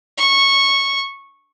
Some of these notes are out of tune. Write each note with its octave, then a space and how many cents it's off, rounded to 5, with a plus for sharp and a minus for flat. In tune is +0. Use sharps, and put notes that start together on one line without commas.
C#6 -10